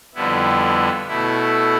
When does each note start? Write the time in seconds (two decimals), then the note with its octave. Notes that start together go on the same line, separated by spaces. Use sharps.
0.15 F2 D3 G3 B3 E4
1.08 B2 A3 E4